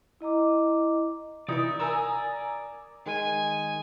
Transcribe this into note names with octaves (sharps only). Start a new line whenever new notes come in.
E4 D#5 A#5 D6
C3 E3 D#4 E4 D5 E5
A#4 G#5 A#5 D#6 E6
D#3 G#3 G#5